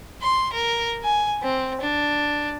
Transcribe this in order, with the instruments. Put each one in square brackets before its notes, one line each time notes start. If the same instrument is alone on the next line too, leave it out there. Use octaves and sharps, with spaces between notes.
[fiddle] C6
A#4
G#5
C4
D4